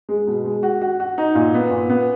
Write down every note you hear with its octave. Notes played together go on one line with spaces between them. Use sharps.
G#3
B2
G#3
F#4
F#4
F#4
D#4
A#2
B3
A#2
B3